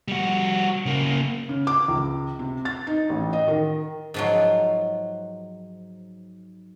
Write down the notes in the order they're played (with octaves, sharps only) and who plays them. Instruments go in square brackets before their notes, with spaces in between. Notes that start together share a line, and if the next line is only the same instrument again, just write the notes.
[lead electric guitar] G3 F#4
C#3 A#3
[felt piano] C#3
D6
C#2
C3
A6
D#4
A1
D#5
D#3
[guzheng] G#2 F3 F#3